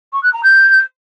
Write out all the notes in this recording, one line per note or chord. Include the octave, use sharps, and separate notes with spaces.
C#6
F#6
A#5
G6